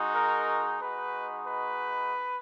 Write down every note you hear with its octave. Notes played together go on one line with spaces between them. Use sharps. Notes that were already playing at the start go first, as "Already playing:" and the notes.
Already playing: G#3 D#4 F#4
A#4
G#3 D#4 F#4 B4
B4